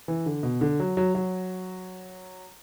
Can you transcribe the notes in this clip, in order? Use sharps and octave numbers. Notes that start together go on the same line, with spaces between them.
E3
D3
B2
D3
F#3
F#3
F#3